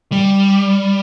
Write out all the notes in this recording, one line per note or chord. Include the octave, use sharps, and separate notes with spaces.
G3